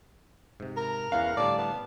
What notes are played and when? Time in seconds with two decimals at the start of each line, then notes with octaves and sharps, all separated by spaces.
0.60 G#2 C3
0.77 A#4 A#5
1.12 E2 E3 C#4 F5 F#5
1.37 A2 D3 G3 D5 A5
1.58 B3 A5